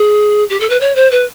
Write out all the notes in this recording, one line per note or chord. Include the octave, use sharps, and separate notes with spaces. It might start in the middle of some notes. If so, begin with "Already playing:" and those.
Already playing: G#4
G4
A4
B4
C#5
C5
B4